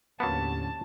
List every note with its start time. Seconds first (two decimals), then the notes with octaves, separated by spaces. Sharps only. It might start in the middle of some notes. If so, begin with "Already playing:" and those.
0.20 D#2 A2 D3 F#3 A#3 B3 C#4 A5